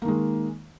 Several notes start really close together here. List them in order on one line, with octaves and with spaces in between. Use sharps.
A#3 D#3 G#3